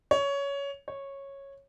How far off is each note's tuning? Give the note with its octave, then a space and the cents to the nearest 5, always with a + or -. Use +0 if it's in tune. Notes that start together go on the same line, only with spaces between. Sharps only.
C#5 +15
C#5 -10